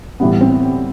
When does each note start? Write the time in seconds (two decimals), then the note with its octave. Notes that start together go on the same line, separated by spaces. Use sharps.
0.20 A2 E3 G3 B3
0.41 C4